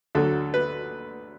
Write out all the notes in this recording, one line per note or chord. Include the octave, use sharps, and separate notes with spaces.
D2 D3 F#3 A4
B4